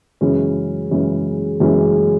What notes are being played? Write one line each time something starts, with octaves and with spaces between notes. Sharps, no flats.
F#2 C#3 E3 G#3 C#4
F#2 C#3 E3 G#3 C#4
F#2 C#3 E3 G#3 C#4